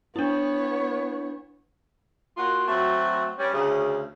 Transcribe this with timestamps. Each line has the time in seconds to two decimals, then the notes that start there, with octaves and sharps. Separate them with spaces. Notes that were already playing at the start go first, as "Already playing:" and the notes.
0.16 B3 D4 E4 C#5
2.37 A#3 F4 F#4
2.67 F#3 A3 C4 F#4
3.38 G3 C#4
3.53 D2 C#3